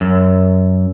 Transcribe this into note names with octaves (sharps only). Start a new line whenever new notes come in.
F#2